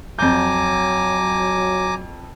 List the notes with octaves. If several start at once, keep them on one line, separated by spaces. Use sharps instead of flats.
F2 F#3 G#5 A#5 D6 G6